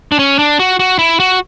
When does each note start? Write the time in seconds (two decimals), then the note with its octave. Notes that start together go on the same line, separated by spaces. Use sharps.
0.12 D4
0.19 C#4
0.39 D4
0.59 F#4
0.80 F#4
0.99 E4
1.20 F#4